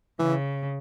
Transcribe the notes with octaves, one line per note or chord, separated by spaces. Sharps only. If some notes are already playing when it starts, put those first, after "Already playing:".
C#3 E3